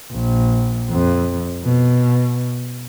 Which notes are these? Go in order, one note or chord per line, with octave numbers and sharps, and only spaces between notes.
A#1
F2
B2